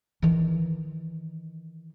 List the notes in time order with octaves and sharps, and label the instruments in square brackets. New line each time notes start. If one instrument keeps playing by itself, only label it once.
[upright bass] D#3 E3